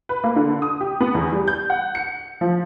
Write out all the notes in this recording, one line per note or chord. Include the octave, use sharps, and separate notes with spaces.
B4
A#3
D3
D#6
G4
B3
E2
G3
G6
F#5
C#7
F3